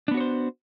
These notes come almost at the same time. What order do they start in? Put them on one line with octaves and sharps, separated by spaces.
D4 B3 F#4 C#5 C5